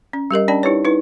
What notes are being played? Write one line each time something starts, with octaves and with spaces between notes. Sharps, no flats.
C#4
G3 G4 A#4 D#5
C#4 D4 D5 G5 A5
D#4 E4 G4 B4 C#5
D#4 E4 B4